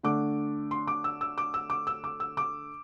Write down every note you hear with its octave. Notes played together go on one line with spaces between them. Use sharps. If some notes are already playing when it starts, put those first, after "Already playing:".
D3 A3 D4 D6
C6
D6
E6
E6
D6
E6
D6
E6
D6
E6
D6